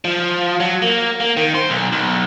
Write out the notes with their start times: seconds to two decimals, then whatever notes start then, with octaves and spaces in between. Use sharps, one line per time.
0.05 F3
0.60 F#3
0.82 A#3
1.20 A#3
1.37 D#3
1.54 C5
1.70 B1
1.92 B1